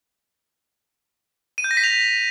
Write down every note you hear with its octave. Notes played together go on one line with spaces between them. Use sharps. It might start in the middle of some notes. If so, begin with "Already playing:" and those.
D#7
G6
A#6
B6
F7